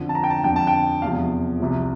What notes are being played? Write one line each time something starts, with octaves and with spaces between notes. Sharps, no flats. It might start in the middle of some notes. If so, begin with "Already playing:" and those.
Already playing: F2 D3 F3
A5
A#5
G5
A5
F2 D3 F3 G5
A5
G5
E2 C3 F3 F5
C2 C3 F3